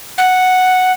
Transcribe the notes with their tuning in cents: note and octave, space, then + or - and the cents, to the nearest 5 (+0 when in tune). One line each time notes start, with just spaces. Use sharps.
F#5 -5